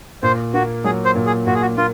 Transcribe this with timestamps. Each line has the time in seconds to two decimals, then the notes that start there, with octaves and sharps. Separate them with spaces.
0.23 A#2 C5
0.54 A#3 F#4
0.84 F#3 G#4
1.05 C5
1.15 A#2
1.26 G#4
1.47 A#2 F#4
1.55 G#4
1.62 F#4
1.77 A#3 F4